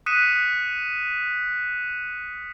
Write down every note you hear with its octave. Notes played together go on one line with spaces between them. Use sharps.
D#6 F#6 B6 C#7 D#7 E7